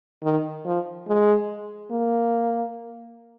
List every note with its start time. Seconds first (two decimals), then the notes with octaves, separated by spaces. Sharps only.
0.23 D#3
0.66 F3
1.08 G#3
1.91 A#3